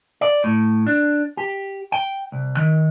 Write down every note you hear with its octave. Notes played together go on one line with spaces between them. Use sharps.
D5
A2
D4
G4
G5
C2
D#3